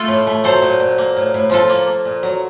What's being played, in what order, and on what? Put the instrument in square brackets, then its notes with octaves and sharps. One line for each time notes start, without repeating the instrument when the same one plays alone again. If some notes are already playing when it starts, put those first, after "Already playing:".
Already playing: [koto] A3 F4 A4
A2
A3
F#3 A4 C5
A#2
A#2
A#3
A2
A2
F3 F4 A4
A#3
A#3
A#2
F#3